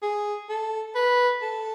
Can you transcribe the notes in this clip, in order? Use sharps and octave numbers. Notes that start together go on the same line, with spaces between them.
G#4
A4
B4
A4